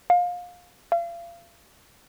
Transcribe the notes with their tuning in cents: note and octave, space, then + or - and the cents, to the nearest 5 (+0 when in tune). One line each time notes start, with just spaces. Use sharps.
F5 +25
F5 -35